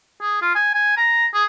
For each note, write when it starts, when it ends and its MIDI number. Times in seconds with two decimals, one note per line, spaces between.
0.21 0.37 68
0.42 0.52 65
0.55 0.69 80
0.74 0.95 80
0.97 1.26 82
1.34 1.45 68